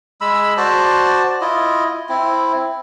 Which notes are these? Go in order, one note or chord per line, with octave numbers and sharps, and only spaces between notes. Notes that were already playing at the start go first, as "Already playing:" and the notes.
G#3 B5 E6
F#4 C5 D5 A5
E4 F4 D#5
C4 E4